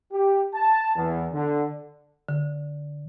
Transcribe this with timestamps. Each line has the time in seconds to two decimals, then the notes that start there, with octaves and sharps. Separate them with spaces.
0.12 G4
0.55 A5
0.97 E2
1.33 D3
2.29 D3